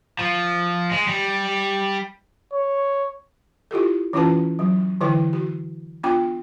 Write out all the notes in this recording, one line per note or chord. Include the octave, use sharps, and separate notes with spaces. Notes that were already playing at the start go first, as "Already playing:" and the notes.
F3
G#3
G3
C#5
E4 F4 G4 A4
E3 C#4 E4 F4 B4 A5
F#3
D3 E3 E4 B4 C5 G5
F#4
B3 D4 F4 G5 D6